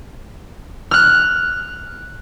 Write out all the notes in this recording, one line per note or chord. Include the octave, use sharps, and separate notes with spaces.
F6 F#6